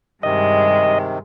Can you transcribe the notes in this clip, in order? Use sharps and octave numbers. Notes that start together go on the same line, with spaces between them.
G2 C3 D#3 G#3 D#5